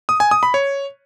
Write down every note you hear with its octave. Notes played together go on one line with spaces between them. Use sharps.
D#6
G#5
D#6
B5
C#5